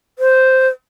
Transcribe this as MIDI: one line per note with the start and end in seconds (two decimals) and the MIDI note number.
0.19 0.68 72